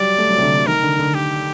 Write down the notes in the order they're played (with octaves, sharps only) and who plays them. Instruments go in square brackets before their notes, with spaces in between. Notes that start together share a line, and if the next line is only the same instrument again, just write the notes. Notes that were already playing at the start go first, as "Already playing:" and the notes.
Already playing: [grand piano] F#3 G3 [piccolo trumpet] D5
[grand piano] A3
F#3
C3
D3
F#3
[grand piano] D#3 [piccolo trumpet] A#4
[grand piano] D3
D3
[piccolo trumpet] G4